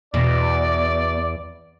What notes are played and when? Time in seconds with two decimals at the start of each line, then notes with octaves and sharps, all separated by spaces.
0.14 E2 B2 D5